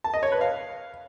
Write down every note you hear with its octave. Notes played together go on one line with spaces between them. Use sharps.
A5
D#5
C#5
B4
F5